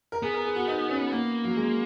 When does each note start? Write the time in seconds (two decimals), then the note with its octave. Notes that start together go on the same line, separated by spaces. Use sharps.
0.12 A#4
0.23 B3 G#4
0.34 A#4
0.45 G#4
0.56 F#4
0.68 D#4
0.90 C#4
1.12 A#3 B3
1.44 F#3
1.56 G#3